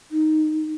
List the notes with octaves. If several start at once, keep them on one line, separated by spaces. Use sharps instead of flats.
D#4